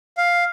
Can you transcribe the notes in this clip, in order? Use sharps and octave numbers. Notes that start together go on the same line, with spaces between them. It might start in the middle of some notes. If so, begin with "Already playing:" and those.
F5